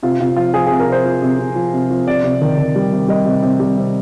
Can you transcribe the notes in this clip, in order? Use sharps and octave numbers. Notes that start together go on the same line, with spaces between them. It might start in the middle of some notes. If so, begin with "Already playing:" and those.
C3 F4
C3 F4
F3 F4
F3 G#4
G#4
C3
A#4
C3 C5
F3
C3
C3
F3
C3
F3
C3 D5
C3
D#3
D#3
G3
C3
G3 D#5
C3
C3
G3
C3